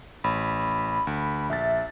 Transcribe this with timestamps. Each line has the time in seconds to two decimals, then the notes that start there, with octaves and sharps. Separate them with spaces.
0.24 A1 B5
1.07 D2
1.50 A#1 E5 A6